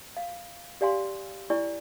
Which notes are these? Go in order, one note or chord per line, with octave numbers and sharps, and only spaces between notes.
F5
G4 D5 F5 G#5 C6
E4 D5 G#5 C#6